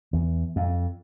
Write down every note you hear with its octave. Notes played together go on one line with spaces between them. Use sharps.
E2
F2